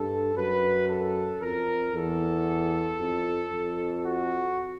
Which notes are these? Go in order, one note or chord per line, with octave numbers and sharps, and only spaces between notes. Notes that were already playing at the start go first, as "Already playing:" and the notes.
Already playing: G2 A4
F#2 B4
A4
F2 A#4
E2 A4
F2
F2
F#4